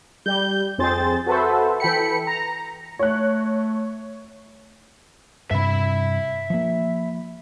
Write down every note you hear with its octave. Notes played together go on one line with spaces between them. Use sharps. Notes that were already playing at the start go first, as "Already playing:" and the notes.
G3 G6
F2 C4 G#4 C5 A6
F#4 A4 B4 C5 E5
E3 A4 G5 B5 C#7
A#5
A3 C#5 F#6
G2 C3 E5 B5
F3 A#3